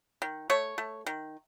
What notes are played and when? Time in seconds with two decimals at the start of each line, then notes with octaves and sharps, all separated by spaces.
0.22 D#3
0.50 A3 C#5
0.78 A3
1.06 D#3